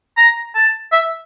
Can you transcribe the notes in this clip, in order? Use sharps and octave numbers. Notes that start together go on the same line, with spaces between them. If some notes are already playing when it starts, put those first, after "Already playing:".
A#5
A5
E5